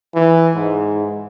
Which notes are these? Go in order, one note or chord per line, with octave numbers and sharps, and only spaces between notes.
E3
G#2